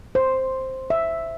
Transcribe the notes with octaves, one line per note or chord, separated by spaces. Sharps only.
C5
E5